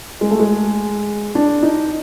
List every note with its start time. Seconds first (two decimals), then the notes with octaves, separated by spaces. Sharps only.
0.21 G#3
0.31 A3
0.39 G#3
1.35 D4
1.63 D#4